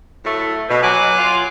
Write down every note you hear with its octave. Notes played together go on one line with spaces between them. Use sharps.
A2 F#3 A3
B2
F#3 G#5 D6 F#6
F4